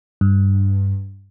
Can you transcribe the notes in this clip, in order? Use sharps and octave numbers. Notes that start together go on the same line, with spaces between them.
G2